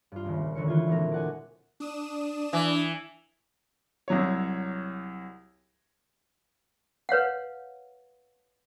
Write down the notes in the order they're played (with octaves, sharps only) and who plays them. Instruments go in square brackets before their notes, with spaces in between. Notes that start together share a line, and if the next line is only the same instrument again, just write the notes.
[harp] G2 F4
D#1 C#2
F1 D3 D#3 C#5 C#7
E3 F4 G#6
E1 A#1 D3 F3 C4 A#4
D5 F#5 G#5
[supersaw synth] D4 D#6 E7
[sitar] E3
[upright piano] C2 F#3 C#5
[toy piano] B4 C#5 F5 F#5